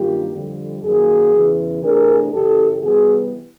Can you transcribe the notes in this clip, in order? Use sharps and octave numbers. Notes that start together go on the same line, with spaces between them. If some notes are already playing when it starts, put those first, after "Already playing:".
Already playing: G2 D#3 F#3 A#3 F4 G4
F2 D3 G3
F#2 D#3 F#3 A#3 F#4 G#4
E2 C#3 E3
C3 E3 A3 D4 G#4 A#4
F#2 C#3 E3 G4 A4
C3 E3 G3 B3 F#4 G#4